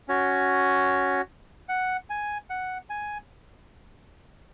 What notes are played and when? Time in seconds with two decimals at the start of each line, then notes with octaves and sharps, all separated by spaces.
0.08 C#4 F#4 C#5
1.69 F#5
2.10 G#5
2.50 F#5
2.90 G#5